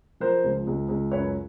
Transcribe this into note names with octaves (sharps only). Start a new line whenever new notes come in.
F3 A#4 C5
C#2
C#2
C#2
F#2 B4 C#5